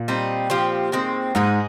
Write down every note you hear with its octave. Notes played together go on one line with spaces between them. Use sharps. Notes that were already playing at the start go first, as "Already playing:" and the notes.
Already playing: A#2
G3 C4 D#4
F3 C4 G4
D#3 G#3 C4
G#2 G#3 D#4 G#4